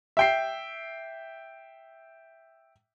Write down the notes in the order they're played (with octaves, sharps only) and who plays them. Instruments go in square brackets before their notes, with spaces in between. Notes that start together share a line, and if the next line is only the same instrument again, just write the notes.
[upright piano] E5 G5 C7